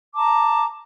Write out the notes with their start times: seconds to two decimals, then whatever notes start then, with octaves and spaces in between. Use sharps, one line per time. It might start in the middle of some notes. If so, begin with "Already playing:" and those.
0.16 A5 A#5 D6